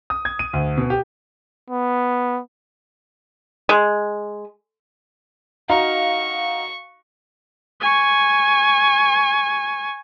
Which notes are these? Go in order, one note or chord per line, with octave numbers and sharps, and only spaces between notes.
D#6
G#6
D#7
D2
B2
G4
B3
G#3
D#4 F#4 F5 A#5 C#6
G#5 C#6